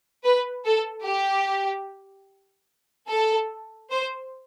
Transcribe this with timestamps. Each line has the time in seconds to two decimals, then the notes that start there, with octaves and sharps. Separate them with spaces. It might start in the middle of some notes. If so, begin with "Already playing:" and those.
0.25 B4
0.66 A4
1.06 G4
3.09 A4
3.91 C5